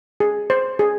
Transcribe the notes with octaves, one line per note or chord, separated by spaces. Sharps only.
G#4
C5
G#4